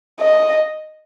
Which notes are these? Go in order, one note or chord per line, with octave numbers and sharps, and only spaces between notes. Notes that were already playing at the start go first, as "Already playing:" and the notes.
D#5